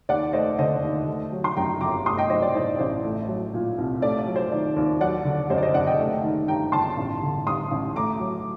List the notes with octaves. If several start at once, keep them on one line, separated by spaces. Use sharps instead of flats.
D#2 D5 F#5
A3 C5 D#5
D3 C5 D#5
D#2
A3
F#3
C6
F#2 G5 A#5
G1 A#5 D6
A3 C6 D#6
D#5 G5
F#3 C5 D#5
D5
A2 C5
A1 C5
A3
F#3
A#2
C2
A3 D5
D5
F#3
C5
D#3 D5
D#2
F#3 D5 F#5
D3
F#2 C5 D#5
D5
C5 D#5
F#1 D5 F#5
D#5 G5
A3
D#3
G2 G5 A#5
G1 A5 C6
A1
D3
G2 C6 D#6
A1
A3 A#5 D6
F#3